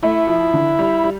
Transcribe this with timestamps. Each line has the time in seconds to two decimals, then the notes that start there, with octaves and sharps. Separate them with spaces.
0.03 A3 E4
0.27 F3
0.53 D3
0.79 G3
1.04 G3